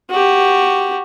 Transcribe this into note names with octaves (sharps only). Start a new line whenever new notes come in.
F#4 G4